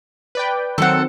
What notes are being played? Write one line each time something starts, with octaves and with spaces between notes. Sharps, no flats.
B4 D5 G5
D#3 F#3 C4 A4 F#5